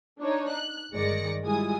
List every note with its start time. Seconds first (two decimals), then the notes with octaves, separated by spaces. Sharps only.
0.20 D4 D#4 C#5
0.50 F#6
0.93 G1 D#3 G#3 D5 A#6 C#7
1.43 G3 G#3 E4 F4 G#5 D#6